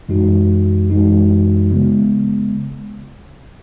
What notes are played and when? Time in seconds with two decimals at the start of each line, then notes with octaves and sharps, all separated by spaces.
0.09 F#2 E3 G#3 D#4 F#4
0.90 F#2 E3 G#3 D#4 F#4
1.72 C#3 G#3 B3